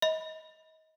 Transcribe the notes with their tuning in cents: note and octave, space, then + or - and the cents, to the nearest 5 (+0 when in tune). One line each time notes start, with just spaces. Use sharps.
D#5 +25 B5 +0